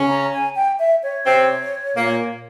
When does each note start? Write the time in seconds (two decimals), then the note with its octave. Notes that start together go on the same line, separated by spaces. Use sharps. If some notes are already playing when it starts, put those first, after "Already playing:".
Already playing: C#3 C#4
0.09 A#5
0.33 G#5
0.55 G5
0.79 E5
1.03 C#5
1.26 C3 C4
1.96 A#2 A#3